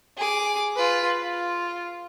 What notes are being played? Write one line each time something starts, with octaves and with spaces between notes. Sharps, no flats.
G#4 D6
F4 B4
F4